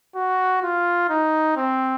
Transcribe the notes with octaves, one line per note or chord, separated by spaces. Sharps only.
F#4
F4
D#4
C4